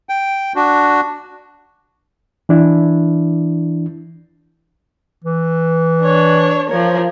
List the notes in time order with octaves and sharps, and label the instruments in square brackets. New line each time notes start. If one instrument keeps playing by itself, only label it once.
[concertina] G5
D4 F#4
[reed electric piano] E3 D4 E4
[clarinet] E3
[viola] D4 C#5
[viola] F3 A#4 [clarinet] C#5